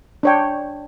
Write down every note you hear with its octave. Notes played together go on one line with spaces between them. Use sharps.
D4 C#5 G5